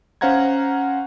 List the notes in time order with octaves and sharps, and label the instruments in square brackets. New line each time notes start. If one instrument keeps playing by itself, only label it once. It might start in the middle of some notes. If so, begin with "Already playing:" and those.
[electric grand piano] C#4 C5 F5 F#5 A#5 G#6